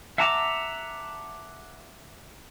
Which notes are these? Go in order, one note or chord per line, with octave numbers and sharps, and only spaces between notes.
E5 F#5 A5 A#5 D6